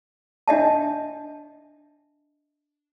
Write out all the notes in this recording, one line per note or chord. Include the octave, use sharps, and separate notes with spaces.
D4 D#5 E5 A5